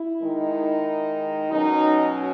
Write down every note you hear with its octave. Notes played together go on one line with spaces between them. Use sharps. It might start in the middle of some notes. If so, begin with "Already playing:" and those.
Already playing: E4
D#3 G#3 D#4
B2 F#3 C#4 D#4